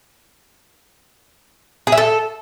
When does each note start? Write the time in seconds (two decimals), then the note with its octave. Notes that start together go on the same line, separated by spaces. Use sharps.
1.87 G#4
1.92 E5
1.98 A4